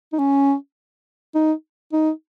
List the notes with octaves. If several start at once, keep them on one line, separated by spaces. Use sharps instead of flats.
D#4
C#4
D#4
D#4